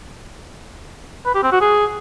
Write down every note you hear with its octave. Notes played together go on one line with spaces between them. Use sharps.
B4
G4
C4
F#4
G#4